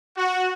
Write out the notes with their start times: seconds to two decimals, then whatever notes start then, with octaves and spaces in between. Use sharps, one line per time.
0.16 F#4